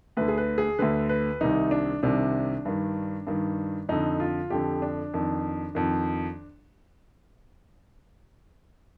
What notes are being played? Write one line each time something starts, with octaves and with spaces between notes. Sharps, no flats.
D2 D3 B4
G#4
B4
G#4
D2 D3 B4
B4
C2 C3 D#3 D#4
D4
C2 C3 D#3 D4
G2 D#3
G2 D#3
F2 D3 D#4
F4
F2 D3 G4
D4
F2 D#3
F2 D#3